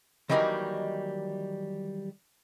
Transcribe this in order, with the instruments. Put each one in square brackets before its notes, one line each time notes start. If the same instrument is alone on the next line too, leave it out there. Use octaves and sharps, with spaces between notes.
[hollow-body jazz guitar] D#3 E3 F#3 G3 A#3 D#4